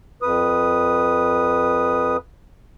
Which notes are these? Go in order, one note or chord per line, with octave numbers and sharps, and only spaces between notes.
F2 B4 D#6